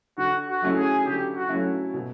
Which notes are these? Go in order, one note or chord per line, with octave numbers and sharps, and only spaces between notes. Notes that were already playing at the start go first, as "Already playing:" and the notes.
D3 F#4
F#4
F#3 A3 C#4 E4
G#4
D3 G4
F#4
F#3 A3 C#4 E4
B2